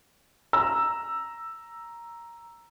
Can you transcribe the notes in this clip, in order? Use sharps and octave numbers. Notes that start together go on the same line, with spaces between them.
A#5 E6